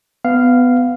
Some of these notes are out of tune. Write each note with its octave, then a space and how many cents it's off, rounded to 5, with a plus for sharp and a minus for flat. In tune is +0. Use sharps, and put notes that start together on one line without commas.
B3 +15 F5 -5